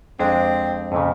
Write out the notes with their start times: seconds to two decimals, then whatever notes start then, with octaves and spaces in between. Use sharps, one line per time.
0.19 F2 G#3 C4 D4
0.92 F2 A#2 C#3